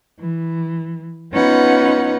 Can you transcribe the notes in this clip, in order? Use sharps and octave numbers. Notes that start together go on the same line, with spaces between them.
E3
B3 C#4 D#4 F4 B4 F#5